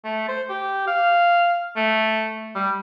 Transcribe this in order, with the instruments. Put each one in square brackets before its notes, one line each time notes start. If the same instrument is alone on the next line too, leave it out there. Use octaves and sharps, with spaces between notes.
[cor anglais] A3
C5
G4
F5
A3
G3